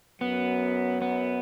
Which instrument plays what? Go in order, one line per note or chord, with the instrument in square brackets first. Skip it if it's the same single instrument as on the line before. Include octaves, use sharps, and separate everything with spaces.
[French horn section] F#2 F#3 [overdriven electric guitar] B3
[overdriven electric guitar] B3